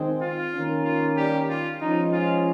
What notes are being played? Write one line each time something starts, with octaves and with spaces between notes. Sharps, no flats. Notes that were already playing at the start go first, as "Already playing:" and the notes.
Already playing: D#3 G#3 C4
F4
D#3 A#3 C#4
F4
G3 G4
F4
F3 G#3 C#4 D#4
F4